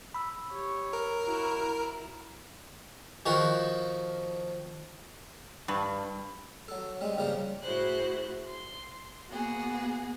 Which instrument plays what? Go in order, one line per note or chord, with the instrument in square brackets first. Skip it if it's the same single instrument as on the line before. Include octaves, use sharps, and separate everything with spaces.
[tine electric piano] B5 E6
[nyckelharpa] G4 C#5
[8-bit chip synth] A#4
[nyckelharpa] E4 F#4
E4
[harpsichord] D#3 F3 F#4
[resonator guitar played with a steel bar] G2
[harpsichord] F#3 A4
G3 G#3 C4
G2 C#3 F3 G3 A#3 C5
[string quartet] A2 E4 F#4 G#4 C5 F#6
C6
A#3 B3 F#4 G#4